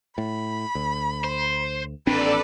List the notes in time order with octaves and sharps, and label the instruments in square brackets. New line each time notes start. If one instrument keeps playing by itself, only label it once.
[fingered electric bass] A2 [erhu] B5
[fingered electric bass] D2
[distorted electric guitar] C5
[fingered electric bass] A1 C4 D4 [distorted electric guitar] A#2 D#3 [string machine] A4 D5 [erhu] B4